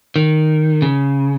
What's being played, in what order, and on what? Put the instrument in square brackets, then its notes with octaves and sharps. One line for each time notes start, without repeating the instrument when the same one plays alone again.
[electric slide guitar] D#3
C#3